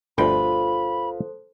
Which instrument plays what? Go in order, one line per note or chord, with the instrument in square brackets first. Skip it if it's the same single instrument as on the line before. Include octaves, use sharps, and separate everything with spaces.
[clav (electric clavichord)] G1 D2 G5 [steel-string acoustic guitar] F4 B4 [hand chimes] A4 C5 [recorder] B5